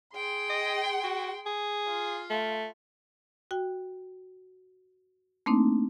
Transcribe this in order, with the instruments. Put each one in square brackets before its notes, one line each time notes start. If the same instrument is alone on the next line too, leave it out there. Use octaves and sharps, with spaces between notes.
[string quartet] G#4 G5 C6
[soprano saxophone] D#5
F#4
G#4
[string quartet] F4
[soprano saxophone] A3
[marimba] F#4 G5
A3 A#3 C4 D4 D#4